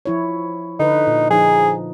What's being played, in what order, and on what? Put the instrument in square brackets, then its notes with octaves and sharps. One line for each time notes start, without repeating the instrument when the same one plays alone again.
[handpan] F3 E4 C#5
[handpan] D3 B4 [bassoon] D#4
[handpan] A#2
[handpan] F3 D#4 [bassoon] G#4